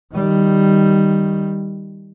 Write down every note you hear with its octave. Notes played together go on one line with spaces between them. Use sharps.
D#3 G3